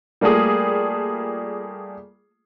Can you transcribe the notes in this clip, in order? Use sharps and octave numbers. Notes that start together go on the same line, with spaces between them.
G3 A3 A#3 F4 G#4